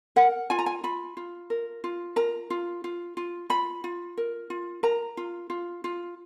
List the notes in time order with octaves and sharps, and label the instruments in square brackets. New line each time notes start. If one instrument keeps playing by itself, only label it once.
[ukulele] A#4 F#5
F4 G#5
A#5
G#5
F4 B5
F4
A#4
F4
A#4 A#5
F4
F4
F4
F4 B5
F4
A#4
F4
A#4 A#5
F4
F4
F4